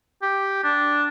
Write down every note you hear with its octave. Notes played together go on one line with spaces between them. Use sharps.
G4
D4